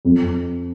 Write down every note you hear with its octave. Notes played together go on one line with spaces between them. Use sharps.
F2